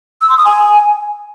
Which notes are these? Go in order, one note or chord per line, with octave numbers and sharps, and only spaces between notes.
E6
C6
D#6
G#5